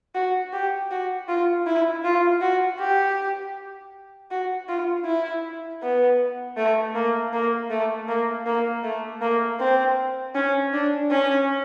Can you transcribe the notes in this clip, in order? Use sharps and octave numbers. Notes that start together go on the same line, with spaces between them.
F#4
G4
F#4
F4
E4
F4
F#4
G4
F#4
F4
E4
B3
A3
A#3
A#3
A3
A#3
A#3
A3
A#3
C4
C#4
D4
C#4